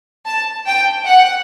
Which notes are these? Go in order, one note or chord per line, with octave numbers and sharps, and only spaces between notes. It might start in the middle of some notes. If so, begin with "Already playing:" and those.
A5
G5
F#5